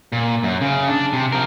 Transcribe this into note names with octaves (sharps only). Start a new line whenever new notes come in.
A#2
F#2
C#3
D4
C3
F3 A#4